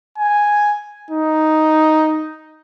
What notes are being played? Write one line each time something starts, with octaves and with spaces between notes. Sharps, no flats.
G#5
D#4